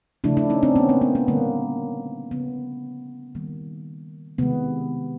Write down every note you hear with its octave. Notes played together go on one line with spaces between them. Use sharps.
C#3 F3 A3 D4 E4
D4 E4
C#4 D#4
C4 D4
B3 C#4
A#3 C4
B3
B3
D3 G3 A#3
C#3 F3 A#3 B3
D#3 G3 A#3
C3 D#3 G#3 B3